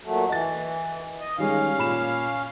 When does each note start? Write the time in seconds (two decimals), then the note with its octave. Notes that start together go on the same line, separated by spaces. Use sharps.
0.03 A#2 F#3 A3
0.29 E3 D#5 A6
1.20 D#5
1.38 D#3 G3 G#3 C#4 F5
1.78 A#2 B5 E7